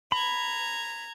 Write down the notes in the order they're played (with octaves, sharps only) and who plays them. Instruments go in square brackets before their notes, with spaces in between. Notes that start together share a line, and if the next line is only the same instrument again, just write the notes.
[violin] A#5 G#6 [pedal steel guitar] B5